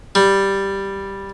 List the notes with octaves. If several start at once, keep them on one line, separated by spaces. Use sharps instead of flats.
G3